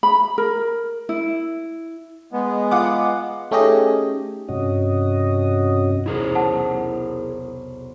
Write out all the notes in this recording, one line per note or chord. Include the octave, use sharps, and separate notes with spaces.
B5
A#4
E4
G#3 B3
F4 F#5 D6
A3 C#4 D#4 G4 G#4 D#5
G2 C3 C#4 F#4 D#5
B1 E2 C3 E4 G#4 A#4
F#5 A5